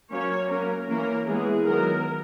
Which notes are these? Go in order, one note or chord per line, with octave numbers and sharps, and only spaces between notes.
F#3 A#3 C#4 C#5
F#3 A#3 C#4 A#4
E3 A#3 C#4 A#4
E3 G#3 B3 G#4
D#3 F#3 B3 A#4